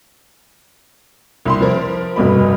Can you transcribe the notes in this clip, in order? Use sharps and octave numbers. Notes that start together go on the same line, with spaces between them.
C2 B5 C6
F3 A#4
F1 G2 B2 B5